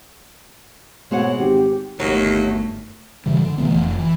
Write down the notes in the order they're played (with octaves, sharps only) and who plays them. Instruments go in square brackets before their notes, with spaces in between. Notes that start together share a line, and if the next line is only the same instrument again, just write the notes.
[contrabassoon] B2 [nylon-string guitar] G#3 C4 F#5 [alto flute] C#5
[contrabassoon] G#1 [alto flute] G4
[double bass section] G1 A3 [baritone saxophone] D#2 [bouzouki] F#3
[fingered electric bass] G2 C#3 E3 G3
D3
B2 E3 A3 B3
F1
E3